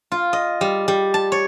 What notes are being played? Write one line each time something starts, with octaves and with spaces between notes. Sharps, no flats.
F4
D#5
G3
G3
A5
C#5